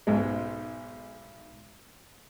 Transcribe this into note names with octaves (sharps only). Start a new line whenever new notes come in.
B1 G#2 G#3